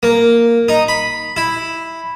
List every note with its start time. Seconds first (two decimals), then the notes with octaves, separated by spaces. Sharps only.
0.03 A#3
0.68 D#4
0.88 B5
1.37 E4